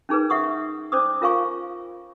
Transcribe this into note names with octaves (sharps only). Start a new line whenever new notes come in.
C#4 D#4 G#4 A#4 B4
E5 F#5 C#6 D#6
C#4 C5 D5 D6 D#6
C#4 F4 A#4 F5 G#5 C#6